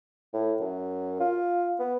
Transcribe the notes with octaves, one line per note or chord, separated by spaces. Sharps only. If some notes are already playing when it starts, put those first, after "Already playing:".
A2
F#2
F4
B3